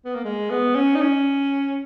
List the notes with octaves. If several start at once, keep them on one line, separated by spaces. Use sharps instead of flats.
B3
A#3
G#3
B3
C#4
D#4
C#4